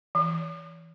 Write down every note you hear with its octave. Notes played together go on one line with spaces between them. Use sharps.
E3